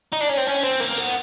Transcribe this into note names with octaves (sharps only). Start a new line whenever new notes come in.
D#4
D4
C#4
C4
C#4
C4
A#3
B3